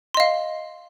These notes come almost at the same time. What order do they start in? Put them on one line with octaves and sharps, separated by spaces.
C6 D#5 F5